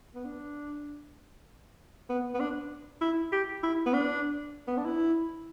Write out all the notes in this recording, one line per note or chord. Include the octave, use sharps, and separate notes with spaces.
B3
D4
B3
B3
D4
E4
G4
E4
B3
D4
B3
D4
E4